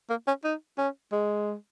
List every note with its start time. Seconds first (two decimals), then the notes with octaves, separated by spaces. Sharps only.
0.10 A#3
0.27 C#4
0.44 D#4
0.78 C#4
1.12 G#3